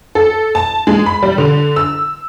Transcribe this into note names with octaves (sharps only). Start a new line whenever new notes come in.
A4
A5
G#3
B5
G3
D3
E6